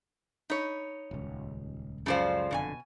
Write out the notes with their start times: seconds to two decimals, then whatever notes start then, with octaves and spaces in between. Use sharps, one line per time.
0.50 D#4 C#5 B5
1.11 D#1 C#2
2.06 C#2 F#2 C#3 F3 A4 C5 D5 F5
2.51 F#1 F2 B2 D3 C#5 G#5